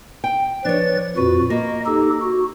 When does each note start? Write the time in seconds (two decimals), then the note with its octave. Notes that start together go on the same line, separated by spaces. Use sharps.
0.24 G5
0.65 F3 D4 B4 C#5 A6
1.17 F2 A#2 F#4 B4
1.50 A#3 D#5
1.86 D#4 G4 A4
2.21 F#4